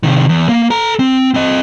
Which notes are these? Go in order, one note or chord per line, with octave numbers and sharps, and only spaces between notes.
C3 D#3
E2
A#3
A4 A#5
C4
C4 D#5